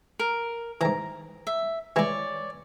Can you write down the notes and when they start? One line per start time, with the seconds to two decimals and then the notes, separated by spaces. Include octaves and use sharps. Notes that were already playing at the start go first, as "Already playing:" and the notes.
0.19 A#4
0.81 G#2 E3 A#5
1.47 E5
1.96 E3 G#3 E4 C#5 D5